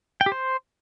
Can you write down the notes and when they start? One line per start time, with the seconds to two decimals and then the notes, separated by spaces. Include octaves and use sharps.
0.21 G5
0.26 G4
0.32 C5